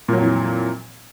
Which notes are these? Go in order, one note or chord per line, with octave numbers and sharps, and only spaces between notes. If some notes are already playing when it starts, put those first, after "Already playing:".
F2 A#2 E3 F#3